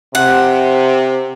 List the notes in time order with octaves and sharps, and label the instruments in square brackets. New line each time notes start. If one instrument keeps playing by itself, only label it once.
[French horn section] C3 [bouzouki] F#5